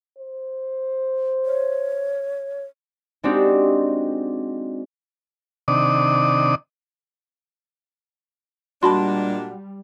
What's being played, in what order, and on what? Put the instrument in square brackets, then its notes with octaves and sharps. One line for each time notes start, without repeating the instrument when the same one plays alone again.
[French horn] C5
[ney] C#5
[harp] G#3 C4 D4 D#4 F#4 G4
[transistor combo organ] C3 D#3 D4 D5 D#6
[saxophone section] A#2 G#3 D4 [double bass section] G3 [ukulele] F#4 [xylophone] A5 B5 C6